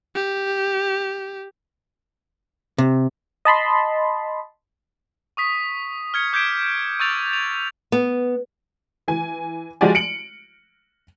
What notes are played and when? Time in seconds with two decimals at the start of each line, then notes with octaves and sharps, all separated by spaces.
0.15 G4
2.78 C3
3.45 D#5 A5 B5 C6
5.37 C#6 D#6 B6
6.14 F6 G#6 C#7
6.33 D6 G6 G#6 B6 D7
7.00 C#6 E6 G6 A6 F7
7.33 F7
7.92 B3
9.08 E3 G#5
9.81 F3 G#3 F#4 G4 D5 G#5
9.95 C#7 D7 F#7